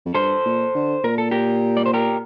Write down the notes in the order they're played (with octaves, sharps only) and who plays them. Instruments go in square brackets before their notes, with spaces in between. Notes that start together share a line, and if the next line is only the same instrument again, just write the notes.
[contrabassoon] F2
[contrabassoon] G2 [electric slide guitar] A4 C5
[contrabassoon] A#2
D3
[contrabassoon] A#2 [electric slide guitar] A#4
[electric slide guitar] A4
G4 A#4
D5
C5
G4 A#4